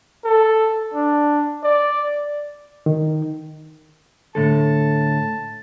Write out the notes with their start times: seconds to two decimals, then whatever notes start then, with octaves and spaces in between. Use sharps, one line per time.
0.24 A4
0.94 D4
1.63 D5
2.86 D#3
4.35 A2 D3 A4 A5